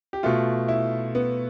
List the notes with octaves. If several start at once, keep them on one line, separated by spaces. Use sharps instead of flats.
G4
B2 A3 F4
E4
B3